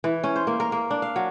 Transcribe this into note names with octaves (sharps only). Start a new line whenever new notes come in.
E3
C#4
C5
A#3
A#4
A#3
D4
F5
F#3